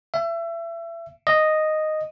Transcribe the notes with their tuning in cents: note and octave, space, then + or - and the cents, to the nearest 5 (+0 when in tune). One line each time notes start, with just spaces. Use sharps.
E5 +30
D#5 -5